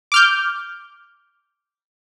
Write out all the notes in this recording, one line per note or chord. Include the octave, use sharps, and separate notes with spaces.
D6 F6 G6